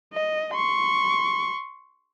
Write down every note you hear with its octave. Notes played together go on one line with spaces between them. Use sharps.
D#5
C6 C#6